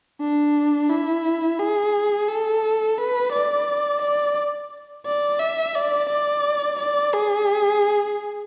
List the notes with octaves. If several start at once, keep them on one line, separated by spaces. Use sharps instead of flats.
D4
E4
G#4
A4
B4
D5
D5
D5
E5
D5
D5
D5
G#4